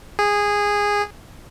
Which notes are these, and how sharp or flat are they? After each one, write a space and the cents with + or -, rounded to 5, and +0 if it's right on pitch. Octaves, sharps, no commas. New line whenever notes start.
G#4 -15